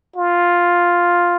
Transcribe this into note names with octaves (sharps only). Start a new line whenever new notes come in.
F4